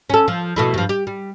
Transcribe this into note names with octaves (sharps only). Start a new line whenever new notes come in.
C#4 A4
F3
B2 A3 E4
G2 F3
G4
G3